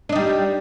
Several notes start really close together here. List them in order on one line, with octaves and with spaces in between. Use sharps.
D4 D#4 G3